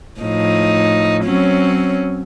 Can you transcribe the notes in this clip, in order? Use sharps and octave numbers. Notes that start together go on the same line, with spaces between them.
A2 F3 D#4
F#3 C4 C#4